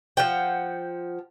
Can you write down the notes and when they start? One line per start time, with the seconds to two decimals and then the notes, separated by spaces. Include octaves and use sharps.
0.17 F3 F#5 G5